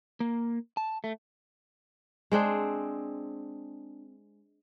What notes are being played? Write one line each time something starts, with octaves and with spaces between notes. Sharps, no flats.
A#3
A5
A3
G#3 C4 D4 G#4